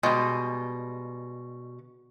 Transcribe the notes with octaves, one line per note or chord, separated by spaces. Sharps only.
B2 G3 G#3